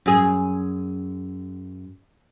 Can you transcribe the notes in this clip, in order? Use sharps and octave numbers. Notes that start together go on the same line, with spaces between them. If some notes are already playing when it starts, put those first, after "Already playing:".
F#2 G#4